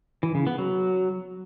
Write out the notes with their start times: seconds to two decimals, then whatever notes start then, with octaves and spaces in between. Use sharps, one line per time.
0.23 E3
0.35 C#3
0.47 B3
0.58 F#3